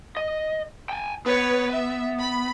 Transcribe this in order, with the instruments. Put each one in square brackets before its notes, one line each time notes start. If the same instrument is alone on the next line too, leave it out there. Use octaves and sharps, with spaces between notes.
[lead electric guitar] D#5
G5 G#5
[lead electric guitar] B3 [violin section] B4 C#5
[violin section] E5
B5